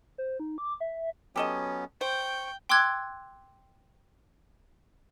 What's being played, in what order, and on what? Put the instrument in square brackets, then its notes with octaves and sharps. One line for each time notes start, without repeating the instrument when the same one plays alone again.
[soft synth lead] C5
D#4
D6
E5
[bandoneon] F#3 B3 C#4 [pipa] G4 A4 D#5
[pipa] C5 [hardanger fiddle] G5 [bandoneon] C#6
[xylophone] G5 C6 D6 E6 F#6 G#6